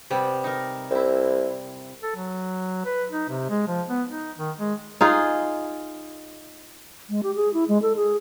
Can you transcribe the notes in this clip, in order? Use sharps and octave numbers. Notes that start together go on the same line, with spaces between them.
C3 G3 B3
D#4 A#4
C2 C4 E4
A4
F#3
B4
D#4
C3
G#3
F3
B3
D#4
D#3
G#3
D#4 F4 G#4
G#3
G4
G#4
E4
G#3
A4
G#4